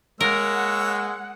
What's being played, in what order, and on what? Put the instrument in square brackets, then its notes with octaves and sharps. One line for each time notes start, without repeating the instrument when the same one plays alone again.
[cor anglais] G#3 [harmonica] A#3 C#5 E6 [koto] A#4 [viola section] F#5